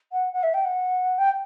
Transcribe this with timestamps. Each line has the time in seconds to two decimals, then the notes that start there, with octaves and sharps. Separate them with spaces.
0.12 F#5
0.33 F#5
0.43 E5
0.54 G5
0.64 F#5
1.18 G5